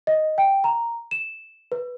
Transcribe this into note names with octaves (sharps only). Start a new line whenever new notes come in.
D#5
G5
A#5
E7
B4